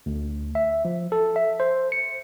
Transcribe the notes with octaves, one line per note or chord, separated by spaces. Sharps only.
D2
E5
F3
A4
E5
C5
C#7